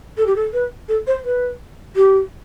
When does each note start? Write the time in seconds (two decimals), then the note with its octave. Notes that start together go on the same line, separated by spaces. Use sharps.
0.17 A4
0.26 G4
0.36 A4
0.53 B4
0.88 A4
1.07 C5
1.25 B4
1.96 G4